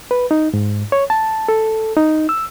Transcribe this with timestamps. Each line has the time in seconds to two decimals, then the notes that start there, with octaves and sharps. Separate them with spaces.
0.11 B4
0.31 D#4
0.54 G#2
0.92 C#5
1.10 A5
1.49 A4
1.97 D#4
2.29 E6